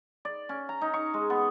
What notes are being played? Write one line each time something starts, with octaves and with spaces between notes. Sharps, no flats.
D5
C#4
A#5
D#4
C#6
G#3
B3